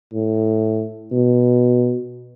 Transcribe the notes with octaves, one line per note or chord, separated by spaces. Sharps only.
A2
B2